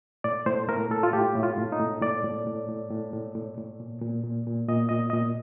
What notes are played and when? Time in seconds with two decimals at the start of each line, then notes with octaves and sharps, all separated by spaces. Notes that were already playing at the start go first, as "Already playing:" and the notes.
0.24 A2 D5
0.46 A2 C5
0.69 A2 A#4
0.91 A2 A4
1.03 F4
1.13 A2 G4
1.35 A2
1.43 F4
1.58 A2
1.72 D#4
1.80 A2
2.02 A2 D5
2.24 A2
2.46 A2
2.69 A2
2.91 A2
3.13 A2
3.35 A2
3.57 A2
3.80 A#2
4.02 A#2
4.24 A#2
4.47 A#2
4.68 A#2 D#5
4.89 A#2 D#5
5.10 A#2 D#5